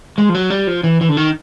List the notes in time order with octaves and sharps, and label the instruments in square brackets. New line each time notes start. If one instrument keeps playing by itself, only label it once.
[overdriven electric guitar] G#3
F3
F#3
G3
F3
E3
E3
D3
D#3